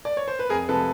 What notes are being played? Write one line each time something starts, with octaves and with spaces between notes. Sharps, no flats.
D5
C#5
C5
B4
F2 G#4 A#4
C3 F3 G#3 A4 B4